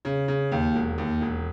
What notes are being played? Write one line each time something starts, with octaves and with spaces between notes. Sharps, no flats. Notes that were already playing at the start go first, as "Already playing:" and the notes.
C#3
C#3
D#2
E1
D#2
E1